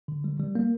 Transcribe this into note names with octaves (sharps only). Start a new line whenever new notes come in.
D3
G3
G3
A#3